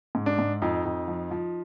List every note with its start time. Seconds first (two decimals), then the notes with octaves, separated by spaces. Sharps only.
0.15 G#2
0.26 D4
0.39 G#2
0.62 F2 D#4
0.85 F2
1.08 F3
1.31 F3